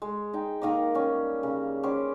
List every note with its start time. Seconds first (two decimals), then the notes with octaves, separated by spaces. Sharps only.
0.02 G#3
0.33 D#4 G5
0.62 D#3 A#3 D#5 D6
0.95 G3 C#4
1.43 C#3
1.83 G3 C#4 C5 D6